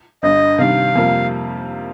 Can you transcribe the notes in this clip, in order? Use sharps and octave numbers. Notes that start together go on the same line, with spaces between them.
G1 G2 D3 D#5
C3 D#3 G3 D4 F5
F2 C3 G3 A#3 F4